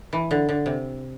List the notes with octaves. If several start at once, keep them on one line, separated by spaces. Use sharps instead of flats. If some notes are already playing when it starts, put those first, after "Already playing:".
E3
D3
D3
C3